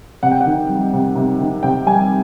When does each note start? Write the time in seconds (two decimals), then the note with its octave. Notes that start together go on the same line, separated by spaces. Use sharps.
0.23 C3 F#5
0.31 G5
0.41 D#3 F#5
0.69 G3
0.93 C3
1.16 C3
1.40 D#3
1.63 C3 G5
1.86 G3 G#5